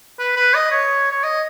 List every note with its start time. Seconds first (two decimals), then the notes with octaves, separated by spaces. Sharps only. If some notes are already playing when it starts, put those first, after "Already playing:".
0.19 B4
0.36 B4
0.54 D#5
0.71 C#5
1.11 C#5
1.24 D#5